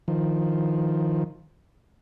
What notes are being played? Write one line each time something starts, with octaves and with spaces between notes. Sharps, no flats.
D#3 F3